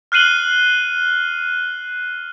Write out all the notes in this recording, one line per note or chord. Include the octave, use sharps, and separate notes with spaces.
F6 F#6 C7 D#7 F#7 G7